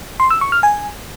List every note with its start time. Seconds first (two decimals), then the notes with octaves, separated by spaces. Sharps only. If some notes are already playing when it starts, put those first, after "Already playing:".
0.20 C6
0.30 E6
0.41 C#6
0.52 F6
0.63 G#5